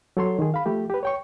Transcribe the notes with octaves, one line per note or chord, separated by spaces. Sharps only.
F#3 A4 C#5 C6
D#3 G#4
F5 B5
F3 A3 G4
G4 B4
C#5 G5 C#6